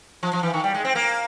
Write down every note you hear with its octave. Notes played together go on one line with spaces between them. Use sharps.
F3
F3
E3
D#3
G3
G#3
C4
A#3